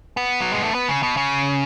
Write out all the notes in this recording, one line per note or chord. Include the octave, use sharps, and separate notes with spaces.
B3
F#3
G#3
A3
B3
C#3
B2
C#3